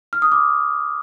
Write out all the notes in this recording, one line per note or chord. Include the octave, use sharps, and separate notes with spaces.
F6
D#6
D6